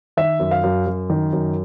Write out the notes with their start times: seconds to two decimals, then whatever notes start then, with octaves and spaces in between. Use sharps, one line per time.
0.17 D#3 E5
0.40 F#2
0.51 F5
0.63 F#2
0.87 F#2
1.10 D#3
1.33 F#2